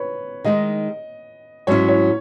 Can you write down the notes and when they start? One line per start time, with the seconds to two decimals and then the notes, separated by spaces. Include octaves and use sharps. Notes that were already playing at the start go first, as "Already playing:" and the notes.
Already playing: B4 C#5
0.44 D#3 G#3 D#4 D#5
1.67 G#2 F#3 C#4 E4 C#5
1.88 C#5